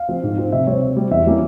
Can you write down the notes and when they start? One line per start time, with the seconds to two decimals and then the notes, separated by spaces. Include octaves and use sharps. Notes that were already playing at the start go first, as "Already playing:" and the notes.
Already playing: F5
0.09 F3 C4
0.23 G#2
0.38 F3 C4
0.52 C3 E5
0.67 G3 C4 C#5
0.82 C3
0.97 G3 C4
1.11 E2 E5
1.26 E3 G3 A#3 C#4